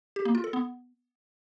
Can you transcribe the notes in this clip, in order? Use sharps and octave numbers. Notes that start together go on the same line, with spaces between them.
G4
A#3
F4
A4
B3